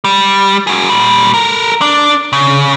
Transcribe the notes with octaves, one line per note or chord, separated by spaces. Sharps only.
G3
F#4 G#4
A#2 G3
A4 A#4
D4
C#3